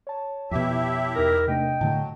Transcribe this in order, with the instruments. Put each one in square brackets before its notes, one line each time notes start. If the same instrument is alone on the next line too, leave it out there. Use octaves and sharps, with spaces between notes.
[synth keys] C#5 A5
[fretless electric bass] F2 B2 [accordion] E4 G4 E5
[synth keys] E2 D#4 A#6 [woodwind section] A#4
[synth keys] C3 A3 D4 [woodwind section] D#5 G5
[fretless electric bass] A2 D3 A3 [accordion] F#3 [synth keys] A5